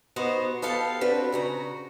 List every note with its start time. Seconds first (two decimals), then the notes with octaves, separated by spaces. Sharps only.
0.16 B3 D#4 F#4 C5
0.62 B3 A4 F5 G5 A5
1.01 C4 D4 F#4 B4
1.32 C#3 F#4 A#5